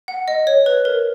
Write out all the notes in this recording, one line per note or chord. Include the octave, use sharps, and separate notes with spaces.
F#5
D#5
C#5
B4
A#4